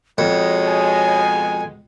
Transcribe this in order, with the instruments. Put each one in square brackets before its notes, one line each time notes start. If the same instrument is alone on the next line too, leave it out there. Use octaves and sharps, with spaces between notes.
[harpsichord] F2 [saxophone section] B2 G#3 [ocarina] C#5
[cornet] G#5